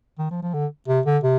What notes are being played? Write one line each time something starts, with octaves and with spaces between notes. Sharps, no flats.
D#3
F3
F3
D3
C3
D3
C3